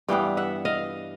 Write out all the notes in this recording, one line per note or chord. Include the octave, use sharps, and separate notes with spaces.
G2 E3 G3 B3 F5 G5
E5 F#5
D#5 F5